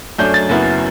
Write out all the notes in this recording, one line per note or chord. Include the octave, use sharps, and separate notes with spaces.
F#2 F#3 A3 D4 G6
A6
F#1 F#2 F#3 B3 E4